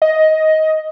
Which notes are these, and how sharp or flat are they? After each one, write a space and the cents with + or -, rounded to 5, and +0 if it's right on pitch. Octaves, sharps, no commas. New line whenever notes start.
D#5 +10